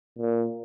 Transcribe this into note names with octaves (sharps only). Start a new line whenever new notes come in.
A#2